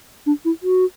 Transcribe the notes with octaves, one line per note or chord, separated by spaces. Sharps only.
D4
E4
F#4